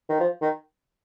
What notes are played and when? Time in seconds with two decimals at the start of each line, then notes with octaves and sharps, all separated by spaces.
0.10 D#3
0.20 F3
0.42 D#3